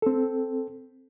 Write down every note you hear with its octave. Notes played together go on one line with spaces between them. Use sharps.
C4 A4